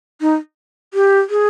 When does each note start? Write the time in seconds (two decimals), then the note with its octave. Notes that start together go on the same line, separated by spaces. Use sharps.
0.21 D#4
0.94 G4
1.30 G#4